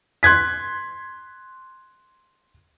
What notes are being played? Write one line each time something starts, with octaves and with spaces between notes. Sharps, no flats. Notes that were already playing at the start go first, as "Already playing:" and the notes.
C6 F#6 G#6 B6